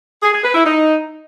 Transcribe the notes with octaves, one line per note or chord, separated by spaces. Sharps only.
G#4
G#4
B4
E4
D#4